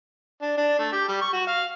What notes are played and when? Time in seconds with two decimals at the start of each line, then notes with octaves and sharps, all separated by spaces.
0.42 D4
0.57 D4
0.79 A3
0.92 G4
1.08 G3
1.21 C#6
1.33 F#4
1.47 F5